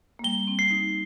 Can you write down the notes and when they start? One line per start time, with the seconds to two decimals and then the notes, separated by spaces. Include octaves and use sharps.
0.19 A#3
0.24 G3 G7
0.47 C4
0.59 C7
0.71 D#4